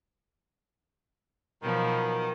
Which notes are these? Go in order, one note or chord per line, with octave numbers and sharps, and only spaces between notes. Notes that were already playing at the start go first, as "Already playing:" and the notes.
B2 D#3 F3 F#3